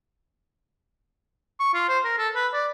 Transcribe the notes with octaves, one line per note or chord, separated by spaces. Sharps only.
C#6
F4
C5
A#4
A4
B4
D5